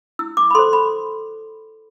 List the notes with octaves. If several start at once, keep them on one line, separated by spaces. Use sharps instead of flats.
E4 E6
D6
B5
A4 C5 C6
B5